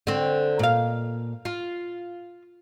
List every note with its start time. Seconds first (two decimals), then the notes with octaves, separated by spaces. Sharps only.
0.07 D3 C4
0.59 A#2 F5
1.45 F4